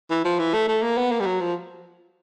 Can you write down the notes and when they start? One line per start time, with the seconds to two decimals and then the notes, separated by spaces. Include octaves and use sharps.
0.11 E3
0.25 F3
0.39 E3
0.54 A3
0.68 A3
0.83 A#3
0.97 B3
1.12 A#3
1.21 G3
1.26 F#3
1.41 F3